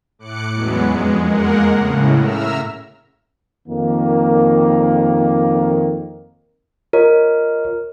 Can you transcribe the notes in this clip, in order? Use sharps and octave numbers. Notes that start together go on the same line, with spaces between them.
A2 D6 F#6 C#7
E2 F#3 G#3 B3 C#4
F2 G#3
G#3 A#3 A#4 F#5
A2 C#3
E5 A#5 E6 F6
F2 D#3 A#3
F4 A#4 C#5 D#5